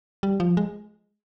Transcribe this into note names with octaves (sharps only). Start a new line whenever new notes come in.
G3
F3
G#3